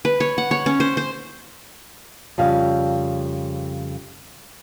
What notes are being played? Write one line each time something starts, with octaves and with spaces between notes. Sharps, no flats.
B4
C#5
F#5
C#5
C#4
C5
C5
F2 C#3 G3 F5